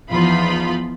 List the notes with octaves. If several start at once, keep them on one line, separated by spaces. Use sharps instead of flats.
E2 F3 D#4 F4 B5